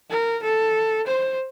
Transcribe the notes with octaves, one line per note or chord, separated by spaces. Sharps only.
A#4
A4
C5